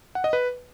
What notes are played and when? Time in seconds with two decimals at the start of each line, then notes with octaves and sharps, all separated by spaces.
0.15 F#5
0.24 D#5
0.33 B4